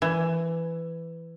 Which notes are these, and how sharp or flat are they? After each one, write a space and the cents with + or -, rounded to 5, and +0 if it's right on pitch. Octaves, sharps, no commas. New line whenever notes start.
E3 +10